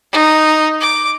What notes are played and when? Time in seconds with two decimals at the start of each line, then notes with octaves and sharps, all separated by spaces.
0.12 D#4
0.81 D6